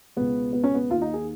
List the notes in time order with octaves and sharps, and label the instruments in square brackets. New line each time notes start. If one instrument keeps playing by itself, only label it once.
[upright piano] C#2 B2 B3
B3
C#4
B3
D#2 D#3 F4
D#4
G#4